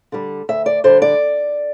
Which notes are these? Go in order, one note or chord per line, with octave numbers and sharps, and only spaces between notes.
D3 G3
D2 E5
D5
D3 G3 C5
D5